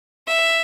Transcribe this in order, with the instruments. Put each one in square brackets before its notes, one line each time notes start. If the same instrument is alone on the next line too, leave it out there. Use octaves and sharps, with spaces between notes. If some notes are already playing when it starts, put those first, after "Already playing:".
[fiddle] E5